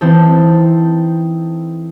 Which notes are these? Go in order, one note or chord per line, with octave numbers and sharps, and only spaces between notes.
E3 C4 D#4 A4